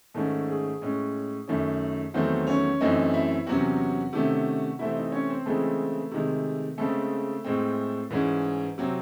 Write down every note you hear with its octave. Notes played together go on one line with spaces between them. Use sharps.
G#2 D#3 A3 C#4 A4
G#4
A2 G#3 C#4
F#2 D#3 A3 C#4
E2 D#3 F#3 A3 C4 C5
C#4 C#5
F#2 E3 A3 C4 D#4 D#5
E4 E5
E2 C3 F#3 C#4 F#4 F#5
C3 D#3 A3 C#4
C3 E3 A3 C4 E4 E5
D#4 D#5
C#4 C#5
C4 C5
C#3 E3 G#3 A3 C4 A4
C3 D#3 G#3
C#3 G#3 A3 C4 A4
A2 G#3 C4
G#2 E3 G#3 C#4
C3 F#3 C4